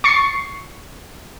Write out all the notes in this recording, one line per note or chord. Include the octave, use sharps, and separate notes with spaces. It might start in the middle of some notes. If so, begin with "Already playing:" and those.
C#6 A6 C7 C#7